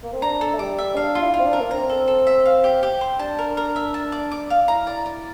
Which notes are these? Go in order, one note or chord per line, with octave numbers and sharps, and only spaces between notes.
A#3
C4
D4 A#5
A4
A3
G3 D6
E5
D4 F5
F4
E4
F4
C4
D4
A#4
A#3
C4 A#5
A4
A4
E5
F5
G4
G4
C5
D4 A5
A#4
A#4
E5
A5
D5
D6
F5
E4 A#5
D5
D5